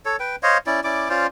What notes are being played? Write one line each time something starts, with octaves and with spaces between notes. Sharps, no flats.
A4 C#5
B4 G5
C5 C#5 D#5 F5
C#4 E4 D5
C#4 E4 D5 D6
C#4 F4 C5 D5